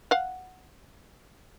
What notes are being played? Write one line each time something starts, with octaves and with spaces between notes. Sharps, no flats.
F5 F#5